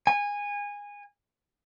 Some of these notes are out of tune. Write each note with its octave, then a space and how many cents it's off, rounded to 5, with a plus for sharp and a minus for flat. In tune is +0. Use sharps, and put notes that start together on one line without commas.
G#5 -20